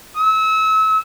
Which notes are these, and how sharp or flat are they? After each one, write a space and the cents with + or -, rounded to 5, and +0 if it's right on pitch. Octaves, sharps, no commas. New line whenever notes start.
E6 -30